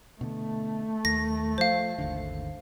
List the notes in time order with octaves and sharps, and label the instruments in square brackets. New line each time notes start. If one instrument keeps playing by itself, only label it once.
[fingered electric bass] B2 D3 [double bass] A3
[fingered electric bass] D#2 [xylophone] A#6
[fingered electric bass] F3 [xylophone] C5 F5
[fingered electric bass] G#1 D#2 D3